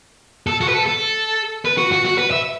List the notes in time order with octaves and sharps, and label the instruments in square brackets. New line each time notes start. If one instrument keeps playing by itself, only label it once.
[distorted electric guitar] A4
F#4
B4
A4
A4
B4
F#4
F#4
F#4
B4
E5